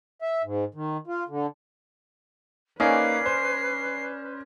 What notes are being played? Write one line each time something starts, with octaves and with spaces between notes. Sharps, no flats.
E5
G#2
D#3
F4
D3
A#3 C#4 D#4 B4 D5 C7
C5